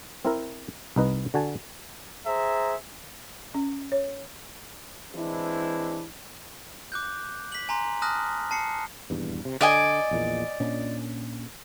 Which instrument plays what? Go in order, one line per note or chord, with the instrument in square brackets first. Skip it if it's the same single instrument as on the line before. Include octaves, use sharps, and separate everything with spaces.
[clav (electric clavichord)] C4 E4 A#4
C2 D#4 B4 D#5
D3 F#4 G#5 A5
[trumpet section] G#4 C5 E5 A#5
[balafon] C#4
C#5
[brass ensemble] E3 G#3 C4 D4 E4
[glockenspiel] D6 F#6 G6
B6 F#7
G#5 A#5 C6
A5 D#6 F6 F#6 A#6
A5 C7 C#7
[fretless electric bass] D#1 E2 G2
C3
[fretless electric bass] D3 [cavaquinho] D5 D#5 G#5
[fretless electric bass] A#1 E2 A#2
A#2 C#4 D4